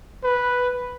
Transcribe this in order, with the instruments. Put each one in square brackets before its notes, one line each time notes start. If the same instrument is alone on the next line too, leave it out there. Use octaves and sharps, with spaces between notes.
[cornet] B4